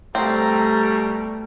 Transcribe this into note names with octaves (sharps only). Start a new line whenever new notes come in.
B2 G3 A3 C4 A#5